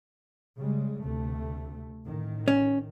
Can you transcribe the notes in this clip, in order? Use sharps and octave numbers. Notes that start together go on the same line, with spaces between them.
C#3 G3 G#3
D2 C3 A3
A1 D#3
C#4